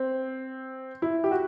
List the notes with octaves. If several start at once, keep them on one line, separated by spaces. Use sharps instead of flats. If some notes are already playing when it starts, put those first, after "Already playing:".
Already playing: C4
E4
G4
F#4